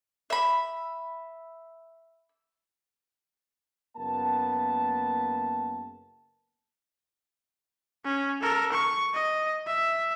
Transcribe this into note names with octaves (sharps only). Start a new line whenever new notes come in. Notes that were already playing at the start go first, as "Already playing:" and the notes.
E5 B5
F#1 A#3 B3 A5
C#4
A4 A#4
C#6
D#5
E5